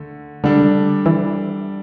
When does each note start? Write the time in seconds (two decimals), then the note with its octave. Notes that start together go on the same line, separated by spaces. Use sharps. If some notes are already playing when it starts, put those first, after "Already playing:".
Already playing: D3 A3
0.44 D3 G3 D4 A4
1.06 E3